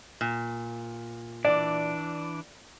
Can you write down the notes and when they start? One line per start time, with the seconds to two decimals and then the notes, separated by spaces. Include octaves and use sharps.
0.21 A#2
1.45 E3 D4 D5